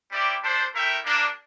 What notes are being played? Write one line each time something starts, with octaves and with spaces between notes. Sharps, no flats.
G3 C4 E4 G4 D5
G3 D4 A4 C5
A3 E4 A#4 E5 G5
G3 A#3 D4